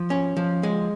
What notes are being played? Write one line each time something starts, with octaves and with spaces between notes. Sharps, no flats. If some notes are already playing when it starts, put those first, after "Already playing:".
Already playing: F3
C#4
F3
G#3